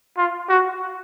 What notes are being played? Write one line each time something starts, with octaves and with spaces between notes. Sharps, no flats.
F4
F#4